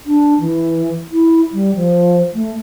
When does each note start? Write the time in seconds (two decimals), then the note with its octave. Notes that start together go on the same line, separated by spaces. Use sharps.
0.06 D4
0.40 E3
1.12 E4
1.53 G3
1.75 F3
2.34 A3